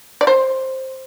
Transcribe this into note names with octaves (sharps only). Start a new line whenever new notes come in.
D5
C5